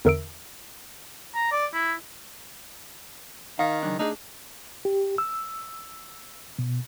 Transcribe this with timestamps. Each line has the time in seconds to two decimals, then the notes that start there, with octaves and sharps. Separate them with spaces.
0.05 E2 D3 A#4 E5 E6 D7
1.35 A#5
1.52 D5
1.73 E4
3.59 D#3 F5
3.83 C#3 F#3 D4
3.99 A3 D4 D#4 G#4
4.85 G4
5.18 E6
6.59 B2